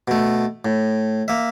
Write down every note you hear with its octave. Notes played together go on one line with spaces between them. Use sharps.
B2 A3
A2
A#3 E5